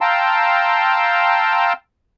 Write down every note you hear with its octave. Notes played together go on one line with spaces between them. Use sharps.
F5 G5 A5 A#5 C6 E6